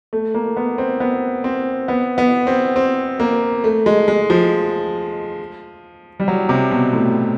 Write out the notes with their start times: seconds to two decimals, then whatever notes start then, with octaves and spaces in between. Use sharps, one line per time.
0.13 A3
0.35 A#3
0.56 B3
0.78 C4
1.00 B3
1.44 C4
1.88 B3
2.18 B3
2.47 C4
2.76 C4
3.20 A#3
3.64 A3
3.86 G#3
4.08 G#3
4.30 F3
6.20 G3
6.28 F#3
6.49 C3
6.71 B2
6.93 A2